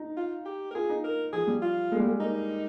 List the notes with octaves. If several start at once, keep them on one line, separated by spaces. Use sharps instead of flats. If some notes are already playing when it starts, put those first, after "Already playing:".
Already playing: D#4
F4
G4
A#4
F4 G#4
D#4
A#4
F3 G#4
G3
F4
G#3
G3
G#3
A#3 D#4